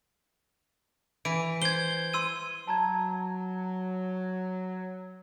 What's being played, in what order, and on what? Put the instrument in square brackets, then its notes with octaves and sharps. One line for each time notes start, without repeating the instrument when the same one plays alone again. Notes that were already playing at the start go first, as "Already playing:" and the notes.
[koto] E3 [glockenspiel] D7
[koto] C5 [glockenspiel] G#6 G7
[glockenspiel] C6 E6 D#7
[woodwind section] F#3 [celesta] A5 A#5 G#6